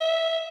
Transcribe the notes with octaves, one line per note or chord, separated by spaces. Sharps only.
E5